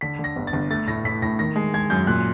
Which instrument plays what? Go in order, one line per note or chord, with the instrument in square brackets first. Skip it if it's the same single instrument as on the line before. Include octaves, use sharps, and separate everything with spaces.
[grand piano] D3 B6
D3
A#6
G1
A6
G1
A3 A6
A2 A#6
A2 B6
A2 A#6
D#3 A#6
G#3
G#3 G#6
F#2 G6
A#2 F#6